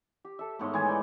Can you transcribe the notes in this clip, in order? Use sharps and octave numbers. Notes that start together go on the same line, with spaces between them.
G4
A4 E5
G#2 A3 B3 C#5 C6
E3 G#3 G#5
D#4 D5 G5